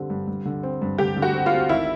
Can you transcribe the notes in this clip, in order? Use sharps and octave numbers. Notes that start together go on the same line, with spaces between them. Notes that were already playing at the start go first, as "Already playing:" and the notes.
Already playing: D3 G3 C4
G2
G2
D3
C4
G2
D3 G4
D3
F#4
C4
F4
C4
G#1 E4